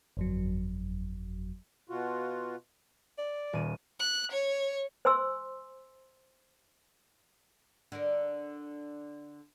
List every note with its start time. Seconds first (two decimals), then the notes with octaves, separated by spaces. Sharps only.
0.17 G1 F2 F#3
1.90 B2 F4 F#4
3.18 D5
3.53 D#1 C#4 D#7
3.99 F#6
4.31 C#5
5.05 C5 G#5 C6 E6
7.92 D3 A#4